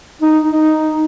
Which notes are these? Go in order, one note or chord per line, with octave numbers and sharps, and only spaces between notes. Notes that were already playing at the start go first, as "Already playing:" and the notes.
D#4
D#4